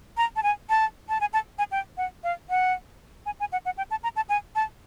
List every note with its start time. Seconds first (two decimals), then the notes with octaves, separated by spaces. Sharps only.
0.17 A#5
0.36 A5
0.43 G#5
0.70 A5
1.09 A5
1.21 G#5
1.33 A5
1.58 G#5
1.71 G5
1.97 F#5
2.24 F5
2.50 F#5
3.26 G#5
3.40 G#5
3.52 F#5
3.65 F#5
3.78 G5
3.91 A5
4.03 A#5
4.16 A5
4.29 G#5
4.55 A5